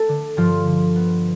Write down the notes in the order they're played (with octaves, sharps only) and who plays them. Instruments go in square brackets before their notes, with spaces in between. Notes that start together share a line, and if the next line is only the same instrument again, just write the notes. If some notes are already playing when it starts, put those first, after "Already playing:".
Already playing: [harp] A3 A4
D3
G2 F3 F4
D3
B3